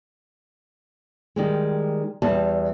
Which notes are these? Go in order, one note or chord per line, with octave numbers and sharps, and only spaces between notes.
D#3 G3 G#3
E2 G3 A5